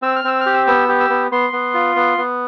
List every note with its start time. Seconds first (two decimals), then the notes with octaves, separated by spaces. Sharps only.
0.02 C4 E6
0.16 F6
0.24 C4 E6
0.41 F6
0.46 G4
0.54 E6
0.67 B3 E6
0.88 G4
1.00 E6
1.10 B3
1.32 B3 C6
1.53 B3
1.74 F4
1.96 B3
2.18 B3